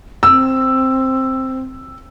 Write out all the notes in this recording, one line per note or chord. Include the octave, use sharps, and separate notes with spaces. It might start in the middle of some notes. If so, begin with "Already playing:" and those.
C4 E6